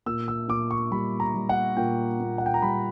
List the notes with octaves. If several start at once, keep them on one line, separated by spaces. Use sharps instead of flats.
A#2 E6
E6
A#2 D6
C#6
G3 B5
A#5
G3
F#5
A#2 G5
A#2
F#5
G5
A#5
G3 B5